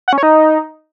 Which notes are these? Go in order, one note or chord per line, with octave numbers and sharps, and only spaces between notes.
F#5
C#4
C#5
D#4